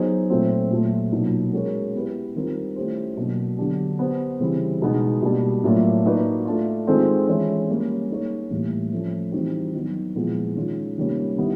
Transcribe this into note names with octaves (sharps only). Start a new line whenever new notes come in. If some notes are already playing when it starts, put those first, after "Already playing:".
Already playing: F#3 B3 D#4 G#4 C5
A#2 F#3 A3 C4
A#2 F#3 A3
B2 F#3 A#3 D#4
G#3 C#4 F#4 A#4 C#5
B3 E4 G4 B4
D#3 G3 C4 F4 A#4
A3 C#4 E4 G4 C5
B2 F#3 A#3 D4
D3 F#3 B3 D4 G4
B3 D4 G4 C5
C#3 E3 G3 C4 E4
B2 G#3 B3 D#4
B2 G3 A#3 D4
A2 F#3 A#3 D4 F4
A#3 D#4 F#4 B4 D5
A3 D4 F4
D#3 G#3 C4 F4 A4
E3 G#3 C#4 E4
G3 A#3 C#4
A#3 D#4 G#4 C#5
A2 E3 G3 A#3
F3 A3 C#4
E3 G3 C4 D#4 F#4
D#3 F#3 B3
A#2 F3 G#3 B3 E4
D#3 G#3 C#4 F4
C3 D#3 G3 A#3 C#4
D#3 G3 B3 E4